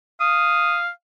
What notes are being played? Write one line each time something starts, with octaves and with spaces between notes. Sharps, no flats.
F5 D#6